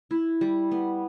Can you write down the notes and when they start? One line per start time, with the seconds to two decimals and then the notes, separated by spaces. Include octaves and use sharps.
0.11 E4
0.41 G3
0.71 B3